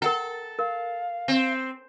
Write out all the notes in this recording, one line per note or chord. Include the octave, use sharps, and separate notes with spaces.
A4 A#4 F#5 G5
A#4 F5
C4